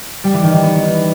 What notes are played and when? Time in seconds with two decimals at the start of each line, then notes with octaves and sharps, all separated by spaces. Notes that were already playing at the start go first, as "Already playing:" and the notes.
0.24 G3
0.34 E3
0.43 D#3
0.53 E3
0.63 B3